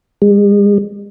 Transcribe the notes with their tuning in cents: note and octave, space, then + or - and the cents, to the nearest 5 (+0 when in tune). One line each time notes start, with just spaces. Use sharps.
G#3 -40